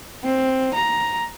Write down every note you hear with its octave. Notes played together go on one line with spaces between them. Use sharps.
C4
A#5